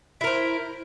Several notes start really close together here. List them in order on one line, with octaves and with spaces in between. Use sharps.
E4 A#4 C5